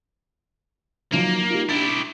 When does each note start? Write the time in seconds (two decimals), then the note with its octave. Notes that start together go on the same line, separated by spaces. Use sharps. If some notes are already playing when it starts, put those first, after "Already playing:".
1.12 D#3 F3 F#3 A#3
1.50 G3 D#4 F4
1.69 D4 E4 G4 A6